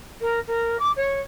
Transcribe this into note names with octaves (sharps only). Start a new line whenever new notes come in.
A#4
A#4
D6
C#5